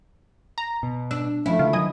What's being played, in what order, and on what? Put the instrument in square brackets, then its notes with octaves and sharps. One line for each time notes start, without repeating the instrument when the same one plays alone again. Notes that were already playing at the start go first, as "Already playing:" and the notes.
[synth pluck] A#5
[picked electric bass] B2
[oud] D4 [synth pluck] E6
[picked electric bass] F3 F#3 C#4 [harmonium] A3 [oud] E4
[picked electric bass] C#3 G#3 [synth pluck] F4
[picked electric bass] D#3 F#3 [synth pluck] D#5 G#5 D#6